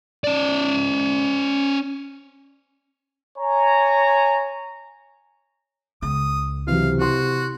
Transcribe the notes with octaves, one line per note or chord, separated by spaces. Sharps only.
C#4 D5
C#5 G#5 A#5
C#2 D#6
C3 E3 F#3 F5
E4 F#4 C6